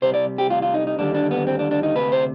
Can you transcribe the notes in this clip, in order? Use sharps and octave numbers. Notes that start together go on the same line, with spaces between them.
C2 C3 G3 C5
D5
G4
F4
F4
D#4
D#4
D#2 D3 G3 D4
D4
B3
C4
D4
D4
D#4
D2 C3 B4
C5